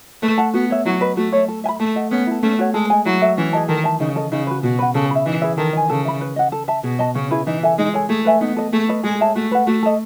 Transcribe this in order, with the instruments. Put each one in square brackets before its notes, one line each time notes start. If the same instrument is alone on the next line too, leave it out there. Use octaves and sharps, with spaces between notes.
[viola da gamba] A3 [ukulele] B4
[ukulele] F#5 A5
[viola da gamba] B3 [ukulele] F#4
[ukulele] C#5 E5
[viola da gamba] F#3 [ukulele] E4
[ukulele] B4 D#5
[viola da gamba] A3 [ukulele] F#4
[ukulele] C#5 E5
A4
E5 G#5
B5
[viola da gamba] A3 [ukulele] A4
[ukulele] D#5 F#5
[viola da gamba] B3 [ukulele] C#4
[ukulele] E4 A4
[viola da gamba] A3 [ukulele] C#4
[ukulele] F#4 C#5 F#5
[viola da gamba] G#3 [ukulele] A4
[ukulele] D#5 G#5
[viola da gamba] F#3 [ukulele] E4
[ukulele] A4 E5
[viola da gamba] E3 [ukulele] C#4
[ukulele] G#4 D#5 A5
[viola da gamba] D#3 [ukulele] A4
[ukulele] E5 A5
[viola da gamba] C#3 [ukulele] D#4
[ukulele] A4 D#5
[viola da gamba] C#3 [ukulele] D#4
[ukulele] F#4 B4
[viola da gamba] B2 [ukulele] F#4
[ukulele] B4 F#5
[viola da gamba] C#3 [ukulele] A4
[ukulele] E5 B5
[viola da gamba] E3 [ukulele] D#4
[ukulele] G#4 B4 E5
[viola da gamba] D#3 [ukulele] A4
[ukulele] D#5 G#5
[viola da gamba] C#3 [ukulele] A4
[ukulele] E5 B5
B4
D#5 F#5
A4
E5 A5
[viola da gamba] B2 [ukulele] G#4
[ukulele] D#5 A5
[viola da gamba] C#3 [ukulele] C#4
[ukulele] E4 G#4 B4
[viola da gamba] E3 [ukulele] D#4
[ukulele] A4 E5 G#5
[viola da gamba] G#3 [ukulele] D#4
[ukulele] A4 C#5 G#5
[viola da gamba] A3 [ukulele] G#4
[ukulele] B4 E5 G#5
[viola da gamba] B3 [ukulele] D#4
[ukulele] A4 D#5
[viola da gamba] A3 [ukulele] G#4
[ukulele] B4 D#5
[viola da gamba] G#3 [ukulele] G#4
[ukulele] C#5 E5 A5
[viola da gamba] A3 [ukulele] F#4
[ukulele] B4 F#5
[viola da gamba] A3 [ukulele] F#4
[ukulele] A4 D#5